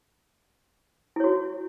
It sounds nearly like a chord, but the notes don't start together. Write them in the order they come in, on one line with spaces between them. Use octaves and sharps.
E4 C#5 F#4